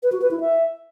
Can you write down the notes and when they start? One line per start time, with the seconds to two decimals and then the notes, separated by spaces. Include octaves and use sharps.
0.03 B4
0.12 F#4
0.22 B4
0.31 E4
0.40 E5